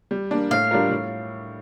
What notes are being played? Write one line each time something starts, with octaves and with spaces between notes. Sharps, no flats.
G3
A#3 D4
A2 F5
G3 D4 F4 A#4
A2